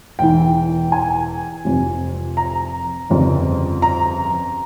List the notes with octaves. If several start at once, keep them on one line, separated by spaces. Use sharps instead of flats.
E1 E2 E3 G5
G#5
F1 F2 C3
A#5
G1 F2 C#3 G3
A#5